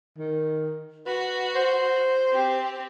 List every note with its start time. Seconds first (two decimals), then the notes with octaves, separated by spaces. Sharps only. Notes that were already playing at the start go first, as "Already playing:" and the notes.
0.18 D#3
1.06 F#4 B4
1.55 C5
2.32 C4 G4